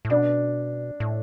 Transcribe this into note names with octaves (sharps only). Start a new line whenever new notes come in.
A2
B2 D4
A2